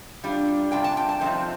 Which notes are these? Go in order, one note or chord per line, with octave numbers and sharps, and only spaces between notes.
C3 G3 D4 F4
C3 G3 D4 F4 G5
A5
G5
A5
C3 F3 A3 C4 D#4